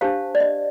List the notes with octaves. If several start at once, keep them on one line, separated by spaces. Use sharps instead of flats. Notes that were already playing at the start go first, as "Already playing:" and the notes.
D4 G4 C5 F5 A5
D5
D#5